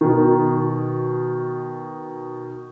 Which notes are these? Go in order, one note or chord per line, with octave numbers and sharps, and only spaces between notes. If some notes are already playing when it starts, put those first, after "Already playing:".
B2 D#3